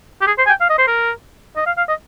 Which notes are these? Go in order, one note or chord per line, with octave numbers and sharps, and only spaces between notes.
G4
G#4
C5
G#5
G5
F5
D#5
C5
A#4
D#5
F5
F5
D#5